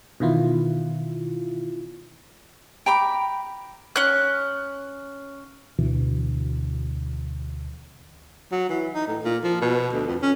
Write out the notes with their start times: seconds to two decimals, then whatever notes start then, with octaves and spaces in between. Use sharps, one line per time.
0.20 B2 D#3 E3 E4 F4
2.86 G5 A#5 B5 D6
3.96 C#4 F#6
5.78 D2 B2 E3
8.52 F#3
8.69 E3
8.94 D#4
9.07 A2
9.24 A#2
9.44 F3
9.61 B2
9.93 D2
10.06 F2
10.22 C#4